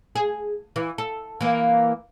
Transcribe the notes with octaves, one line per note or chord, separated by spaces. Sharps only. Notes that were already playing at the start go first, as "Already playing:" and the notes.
G#4
E3
A4
E3 A#3